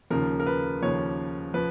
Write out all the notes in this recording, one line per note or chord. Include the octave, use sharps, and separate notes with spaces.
D#2 C#3 F3 A#4
A#4
B4
D#2 C#3 F3 C#5
F3 B4